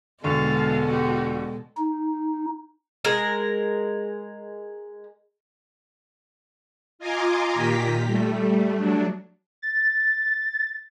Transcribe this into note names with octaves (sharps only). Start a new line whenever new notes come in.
E1 B2 D3 G#3 A4 F5 A5 C#6
F#4 G4
D#4
G#3 A#4
F4 D#5 G#5 A#5 C6 D6
A#2 D#3 G4 A#5 B6
G3 A3
F#3 D4
A6